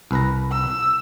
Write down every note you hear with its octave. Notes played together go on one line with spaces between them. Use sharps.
C2 B4 A#5
E6